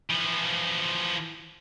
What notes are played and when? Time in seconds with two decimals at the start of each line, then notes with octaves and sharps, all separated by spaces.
0.11 E3 F3